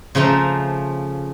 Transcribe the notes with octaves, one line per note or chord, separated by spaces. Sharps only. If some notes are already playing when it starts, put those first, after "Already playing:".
C#3 F3 A3 A5 A#5